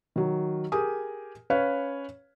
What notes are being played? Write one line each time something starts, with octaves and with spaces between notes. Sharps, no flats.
D#3 F#3
G4 G#4 A#4 G#5 D#6
C#4 B4 C#5 F5